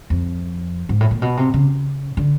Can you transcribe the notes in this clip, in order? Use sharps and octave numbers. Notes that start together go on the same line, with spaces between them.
F2
G#2
A2
A#2
B2
C3
C#3
D3